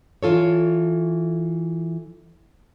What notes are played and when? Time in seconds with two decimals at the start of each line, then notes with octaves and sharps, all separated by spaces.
0.23 E3 F4 A4 C#5